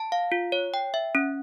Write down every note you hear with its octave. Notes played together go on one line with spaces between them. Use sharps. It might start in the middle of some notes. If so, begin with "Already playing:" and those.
Already playing: A5
F5
F4
C#5
G5
E5
C#4